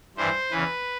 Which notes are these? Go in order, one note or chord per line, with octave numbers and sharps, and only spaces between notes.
G2 E3 C5
E2 C#3 E3 B4